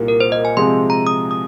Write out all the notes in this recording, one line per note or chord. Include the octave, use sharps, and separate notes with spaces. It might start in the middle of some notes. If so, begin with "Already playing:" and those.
Already playing: C2 A#2 A#3
A#4
C5
D#5
G#5
C3 F3 G#3 C4 G#4 C6
A#5
D#6
D#6